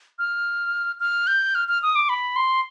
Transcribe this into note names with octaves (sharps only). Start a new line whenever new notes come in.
F6
F6
G6
F6
F6
D#6
D6
B5
C6